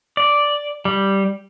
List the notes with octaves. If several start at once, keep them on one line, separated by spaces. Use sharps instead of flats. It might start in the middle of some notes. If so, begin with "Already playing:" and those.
D5
G3